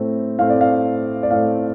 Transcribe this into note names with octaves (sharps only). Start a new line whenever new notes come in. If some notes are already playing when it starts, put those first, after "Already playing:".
Already playing: A2 A3 C4
A2 A3 C4 F5
D5
F5
D5
A2 A3 C4 F5